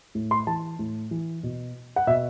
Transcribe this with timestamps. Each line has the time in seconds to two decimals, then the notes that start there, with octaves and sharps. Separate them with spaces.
0.15 A2
0.31 C6
0.47 E3 A5
0.79 A2
1.11 E3
1.43 B2
1.96 F#5
2.07 B2 E5